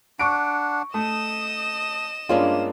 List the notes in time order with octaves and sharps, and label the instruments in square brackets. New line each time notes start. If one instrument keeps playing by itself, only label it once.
[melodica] D4 F#5 [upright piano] C#6 D7
[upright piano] A3 [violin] D#5 E7 [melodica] D#6
[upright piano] G2 C#4 F4 [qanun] G#3 A#3 D4